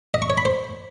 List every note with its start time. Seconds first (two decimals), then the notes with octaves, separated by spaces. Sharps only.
0.14 D#5
0.22 C#6
0.30 C#5
0.38 B5
0.45 C5